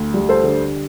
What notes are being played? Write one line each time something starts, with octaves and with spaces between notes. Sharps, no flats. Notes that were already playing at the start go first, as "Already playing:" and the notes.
Already playing: D2
G3
A4 C5
D3